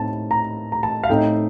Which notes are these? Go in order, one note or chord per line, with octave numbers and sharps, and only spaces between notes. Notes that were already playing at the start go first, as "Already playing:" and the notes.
Already playing: A2 A3 C4 D#4 A5
A#5
A#5
A5
F5
A2 A3 C4 D#4 G5